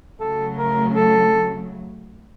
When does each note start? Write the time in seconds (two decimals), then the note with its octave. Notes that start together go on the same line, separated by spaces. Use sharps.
0.19 C#3 F#3 A3 A4
0.58 A#4
0.96 A4